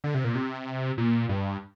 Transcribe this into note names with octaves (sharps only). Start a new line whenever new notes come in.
D3
C3
A#2
C3
A#2
G2